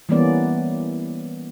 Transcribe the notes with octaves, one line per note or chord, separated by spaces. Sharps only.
E3 G3 A#3 B3 C#4 D5